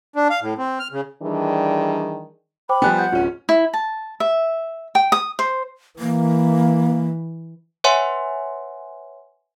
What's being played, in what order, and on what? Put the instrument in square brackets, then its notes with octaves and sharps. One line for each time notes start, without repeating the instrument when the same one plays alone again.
[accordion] D4
F5
A2
C4
F6
C#3
[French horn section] D#3 E3 G3 D4 G#4
[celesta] C5 G5 D6 [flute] B5
[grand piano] F3 G3 B3 [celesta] G5 G#5 F#6
[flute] F#5 [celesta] G6
[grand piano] D1 C#4 [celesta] F4
[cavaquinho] E4
A5
E5
G5
D#6
C5
[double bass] E3 [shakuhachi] A#3
[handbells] B4 C#5 E5 F#5 G#5 C6